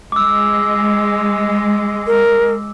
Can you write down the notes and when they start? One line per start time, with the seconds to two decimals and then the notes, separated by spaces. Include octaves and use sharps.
0.12 G#3 D6 E6
2.07 A#4